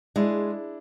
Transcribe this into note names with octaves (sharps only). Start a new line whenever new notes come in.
G#3 D4 E4